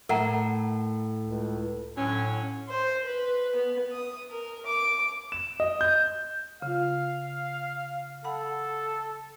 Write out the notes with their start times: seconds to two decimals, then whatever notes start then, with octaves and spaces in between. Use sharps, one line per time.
0.09 A2 A#4 F#5 A#5
1.23 C#2
1.96 A2 D3 F#3 C#4
2.69 C5
3.05 B4
3.56 B3
3.92 D#6
4.31 A#4
4.66 D6
5.32 E7
5.60 D#5
5.81 G6
6.62 C#3 F4 F5
8.24 A4 F5 F#5 B5